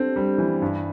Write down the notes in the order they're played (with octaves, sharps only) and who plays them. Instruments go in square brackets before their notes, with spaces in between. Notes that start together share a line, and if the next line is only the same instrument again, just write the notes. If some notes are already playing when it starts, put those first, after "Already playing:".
Already playing: [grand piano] C4 A4 [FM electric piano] D4 G4
[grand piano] G3
E3
G2